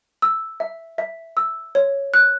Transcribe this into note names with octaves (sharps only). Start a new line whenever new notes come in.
E6
E5
E5
E6
C#5
F#6